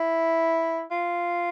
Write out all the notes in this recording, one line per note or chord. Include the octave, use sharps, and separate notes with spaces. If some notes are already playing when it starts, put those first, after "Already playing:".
Already playing: E4
F4